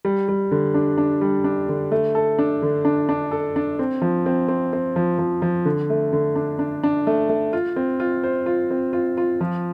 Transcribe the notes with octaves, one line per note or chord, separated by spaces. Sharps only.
G3
G3
D3
D4
D4
G3
D4
D3
A3
A4
D4
D3
D4
D4
A4
D4
C4
F3
C4
C4
C4
F3
F3
F3
D3
A3
D3
D4
D4
D4
A3
A3
F4
C4
F4
C5
F4
C4
F4
F4
F3